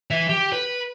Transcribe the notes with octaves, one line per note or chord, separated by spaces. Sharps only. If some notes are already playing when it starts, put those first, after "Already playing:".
E3 E5
G4
B4